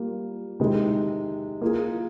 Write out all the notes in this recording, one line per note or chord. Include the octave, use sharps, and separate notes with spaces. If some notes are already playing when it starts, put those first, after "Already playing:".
Already playing: G3 A#3 F4
C3 D#3 G#3
A#3 F4 G#4